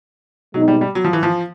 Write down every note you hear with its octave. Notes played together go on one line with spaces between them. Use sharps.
B2 F#3 G#3 C4 D#4
G3
G3
F#3
F3
E3
F3